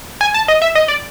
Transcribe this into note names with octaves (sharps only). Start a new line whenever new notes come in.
G#5
A5
D#5
E5
D#5
D5